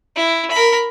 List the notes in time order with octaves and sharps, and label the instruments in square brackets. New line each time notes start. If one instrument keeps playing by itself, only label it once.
[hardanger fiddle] E4
A#4 B5